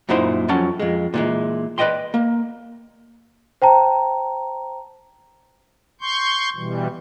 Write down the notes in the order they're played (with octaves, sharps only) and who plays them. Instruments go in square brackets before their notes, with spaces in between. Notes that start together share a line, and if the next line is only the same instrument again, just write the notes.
[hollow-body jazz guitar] F#2 A#2 D#4 E4 C5 C6
F2 F#3 C#4 A5
F2 G#3
A#2 E3 G#3
B4 D5 D#5 G5 C6
A#3
[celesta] C5 G5 A5 A#5
[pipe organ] C6 C#6 G6
B2 E3 G3